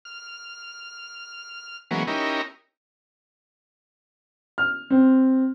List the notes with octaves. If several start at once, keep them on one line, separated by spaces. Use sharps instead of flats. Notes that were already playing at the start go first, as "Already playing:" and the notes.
F6
E3 F#3 G#3 A#3 B3 C#4
C#4 D#4 E4 G4 A#4
F6
C4